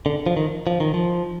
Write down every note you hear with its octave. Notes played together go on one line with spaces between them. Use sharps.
D3
F3
D#3
F3
D#3
F3